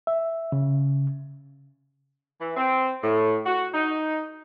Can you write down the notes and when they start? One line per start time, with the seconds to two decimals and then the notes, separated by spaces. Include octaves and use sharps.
0.07 E5
0.52 C#3
2.39 E3
2.56 C4
3.02 A2
3.45 F#4
3.73 D#4